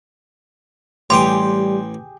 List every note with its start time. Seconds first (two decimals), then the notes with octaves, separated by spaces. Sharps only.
1.10 A1 E3 G3 G4 G#4 G5 C6